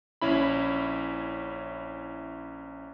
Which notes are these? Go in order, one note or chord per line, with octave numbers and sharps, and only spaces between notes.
A#1 C#4 E4 B5